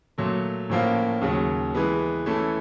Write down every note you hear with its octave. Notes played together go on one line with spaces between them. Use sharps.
A#2 F#3 A3
A2 F3 A#3 C#4 F4
D#2 C#3 F#3
E3 G#3 B3
E3 A3 C#4 E4 A4